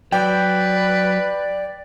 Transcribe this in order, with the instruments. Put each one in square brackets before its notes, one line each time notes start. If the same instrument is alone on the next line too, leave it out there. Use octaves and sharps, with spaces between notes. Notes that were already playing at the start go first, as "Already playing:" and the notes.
[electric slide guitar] F#3 [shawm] B4 [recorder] D5 [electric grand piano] G5